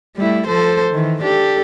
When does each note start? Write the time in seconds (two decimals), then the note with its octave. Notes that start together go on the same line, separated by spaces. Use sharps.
0.16 G3 A3 E4
0.47 F3 A4 C5
0.90 D#3 E3
1.23 D4 G4 A4